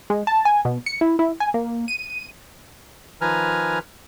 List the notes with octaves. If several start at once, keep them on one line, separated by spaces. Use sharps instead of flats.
G#3
A5
G#5
B2
C#7
E4
E4
G#5
A#3
D#7
D#3 F3 B4 G#5 A#5 F6